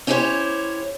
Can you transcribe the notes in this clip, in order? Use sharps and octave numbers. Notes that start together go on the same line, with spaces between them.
C#4 E4 G4 G#4 C5 C#5